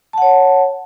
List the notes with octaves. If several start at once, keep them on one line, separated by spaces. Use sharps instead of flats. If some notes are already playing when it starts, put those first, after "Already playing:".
C#5 F#5 A5